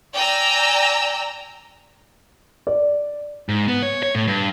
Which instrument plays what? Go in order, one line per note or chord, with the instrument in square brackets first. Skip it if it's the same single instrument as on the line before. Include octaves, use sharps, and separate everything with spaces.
[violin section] D5 G5 G#5 A#5 E6
[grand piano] D5
[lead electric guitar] G#2
B3
C#5
C#5
A2
G2